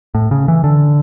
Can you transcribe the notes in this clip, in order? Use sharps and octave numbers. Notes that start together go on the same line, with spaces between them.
A2
C#3
E3
D3